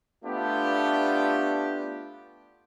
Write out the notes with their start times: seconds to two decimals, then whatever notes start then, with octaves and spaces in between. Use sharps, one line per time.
0.24 A3 B3 D4 F4 G4